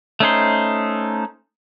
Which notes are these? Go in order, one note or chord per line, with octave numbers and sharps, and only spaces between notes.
A3 C#4 D#4 C5